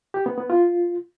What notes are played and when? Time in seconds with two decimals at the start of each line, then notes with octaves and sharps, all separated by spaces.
0.14 G4
0.26 B3
0.38 B3
0.50 F4